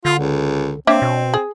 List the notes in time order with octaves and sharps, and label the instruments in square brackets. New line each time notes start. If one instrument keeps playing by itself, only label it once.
[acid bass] D3 [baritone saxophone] F4
[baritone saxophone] C#2
[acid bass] A#3 [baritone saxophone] C4 [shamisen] D4 C#5 E5
[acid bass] B2
[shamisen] G#4